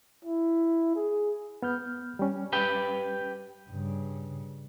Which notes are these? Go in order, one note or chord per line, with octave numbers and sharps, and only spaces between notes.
E4
G#4
B3 F6 G6
G3 C#4
G4 B4 G5
G2 C#3